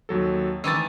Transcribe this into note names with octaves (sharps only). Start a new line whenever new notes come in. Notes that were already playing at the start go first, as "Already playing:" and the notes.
D#2 F#3 A4
D#3 E3 A3 E6 A6